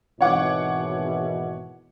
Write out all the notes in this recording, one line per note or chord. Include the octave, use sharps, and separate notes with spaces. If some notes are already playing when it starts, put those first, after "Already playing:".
G#1 B2 E3 C#5 F#5 D6